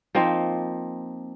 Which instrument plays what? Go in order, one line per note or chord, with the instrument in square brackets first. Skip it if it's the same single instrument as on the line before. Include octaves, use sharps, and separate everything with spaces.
[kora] F3 A#3 C4 D#4